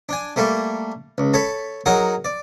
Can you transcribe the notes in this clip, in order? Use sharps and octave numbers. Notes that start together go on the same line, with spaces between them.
D4 G#5
G3 A3 A#3 A4
C#2
A4 C#5 A5 B5
F#3 D#4 G#4 A#4 F#5
D5